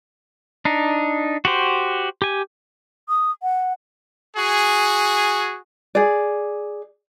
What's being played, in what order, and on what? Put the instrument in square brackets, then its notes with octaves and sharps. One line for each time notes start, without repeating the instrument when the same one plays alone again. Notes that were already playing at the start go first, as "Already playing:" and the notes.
[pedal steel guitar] D4 D#4
F#4 G4 C5
G4 G#5
[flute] D#6
F#5
[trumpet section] F#4 G#4
[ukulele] G#4 D5